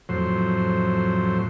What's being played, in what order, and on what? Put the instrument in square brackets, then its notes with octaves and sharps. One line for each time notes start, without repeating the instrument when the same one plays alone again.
[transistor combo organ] F2 A2 F#3 C5